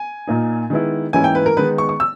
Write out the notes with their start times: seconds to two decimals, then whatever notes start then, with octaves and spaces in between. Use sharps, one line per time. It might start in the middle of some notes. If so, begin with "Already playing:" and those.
Already playing: G#5
0.27 A#2 A#3 D#4
0.70 D#3 G#3 B3 E4
1.13 G#2 E3 A#3 C#4 E4 G#5
1.24 G5
1.35 B4
1.46 A#4
1.57 D#3 G#3 B3 D#4 B4
1.78 C#6
1.89 C#6
2.00 E6